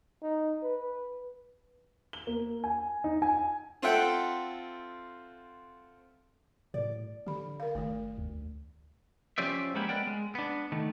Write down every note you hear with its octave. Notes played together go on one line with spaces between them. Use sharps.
D#4
B4
G7
A#3
G#5
D#4
G#5
C4 F4 A4 E5 F#5 G5
A2 D5
D3 G4 B5
A#4 F5
F#1 D#3 A3
D2
F3 C#4 G4 C5 D5 E5
G#3 A#3 B3 C#4 E4 G4
G#3 B3 A#4 D5 F#5 G5
G#3
B3 D4
D#3 A3